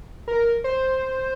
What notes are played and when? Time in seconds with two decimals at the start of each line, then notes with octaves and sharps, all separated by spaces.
0.28 A#4
0.64 C5